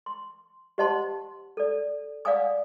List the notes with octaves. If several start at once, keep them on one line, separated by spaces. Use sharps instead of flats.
C6
G4 C5 D#5 F#5 A5 C6
A4 D5
D5 F5 F#5 G#5 D#6